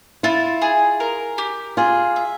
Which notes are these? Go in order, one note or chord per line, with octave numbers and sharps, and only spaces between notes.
E4 F4
G#4
A#4
G4
F4 G#4
E5